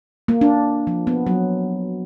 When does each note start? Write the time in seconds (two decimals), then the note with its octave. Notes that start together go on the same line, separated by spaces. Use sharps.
0.28 A#3
0.41 D4
0.87 F3
1.07 B3
1.27 F#3